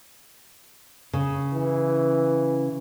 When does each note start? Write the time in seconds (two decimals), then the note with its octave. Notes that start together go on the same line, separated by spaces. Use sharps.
1.13 C#3
1.53 E3